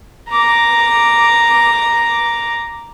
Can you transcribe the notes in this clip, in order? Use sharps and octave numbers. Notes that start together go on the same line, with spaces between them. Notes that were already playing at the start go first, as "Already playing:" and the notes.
A#5 D6